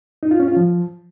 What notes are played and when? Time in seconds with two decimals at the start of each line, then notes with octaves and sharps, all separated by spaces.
0.23 D#4
0.31 F4
0.40 C#4
0.48 F4
0.57 F3